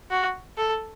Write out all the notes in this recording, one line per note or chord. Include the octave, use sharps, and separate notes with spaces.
F#4
A4